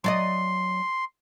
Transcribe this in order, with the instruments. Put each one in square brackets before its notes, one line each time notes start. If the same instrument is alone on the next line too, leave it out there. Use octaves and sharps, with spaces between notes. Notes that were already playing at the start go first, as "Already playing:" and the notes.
[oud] F#3 D5 D#5 [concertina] C6